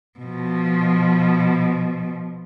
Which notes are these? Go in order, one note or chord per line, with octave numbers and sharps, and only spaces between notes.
B2 F3